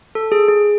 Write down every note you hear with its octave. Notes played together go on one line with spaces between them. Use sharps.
A4
G#4
G#4